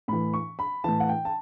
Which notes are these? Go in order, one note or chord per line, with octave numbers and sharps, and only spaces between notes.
A2 E3 B5
C#6
B5
A2 E3 A5
F#5
G5
A5